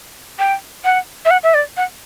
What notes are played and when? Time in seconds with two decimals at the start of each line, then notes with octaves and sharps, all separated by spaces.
0.39 G5
0.84 F#5
1.25 E5
1.31 F#5
1.43 E5
1.54 D5
1.77 F#5